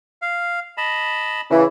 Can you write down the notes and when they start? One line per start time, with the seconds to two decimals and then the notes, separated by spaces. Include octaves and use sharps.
0.22 F5
0.77 D#5 A5 B5
1.51 C#3 E3